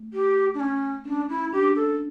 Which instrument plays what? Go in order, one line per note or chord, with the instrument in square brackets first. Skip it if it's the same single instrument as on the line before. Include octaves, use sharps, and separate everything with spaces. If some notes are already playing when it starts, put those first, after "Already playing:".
Already playing: [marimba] A3
[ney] G4
D4
C#4
[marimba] C#4 [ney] D4
[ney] E4
[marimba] D4 [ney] G4
[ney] A4